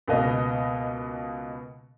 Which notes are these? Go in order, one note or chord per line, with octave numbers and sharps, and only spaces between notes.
C#2 B2 A#3 B3 D#5